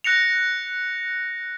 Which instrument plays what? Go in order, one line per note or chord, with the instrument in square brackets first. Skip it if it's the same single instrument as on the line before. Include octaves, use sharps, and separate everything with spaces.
[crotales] F#6 A#6 C#7 F7